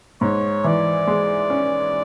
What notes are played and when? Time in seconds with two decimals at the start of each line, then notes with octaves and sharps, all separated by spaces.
0.21 G#2 C#5
0.64 E3 D5
1.07 G#3
1.50 C#4